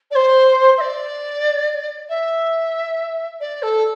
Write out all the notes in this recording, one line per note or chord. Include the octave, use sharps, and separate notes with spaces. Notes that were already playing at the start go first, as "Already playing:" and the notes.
D5
C5
E5
D5
E5
D5
A4